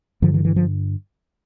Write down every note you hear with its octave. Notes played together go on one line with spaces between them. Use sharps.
G2 D3 F3
E3
E3
F3